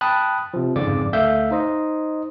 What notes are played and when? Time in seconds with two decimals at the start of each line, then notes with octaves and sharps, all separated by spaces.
0.01 G5 A5 B5 D#6 F#6
0.54 C3 F3
0.76 G1 F2 G#2 C#3 D5 D6
1.13 D2 A3 E5 F5 G6
1.51 D#4 C5 D#5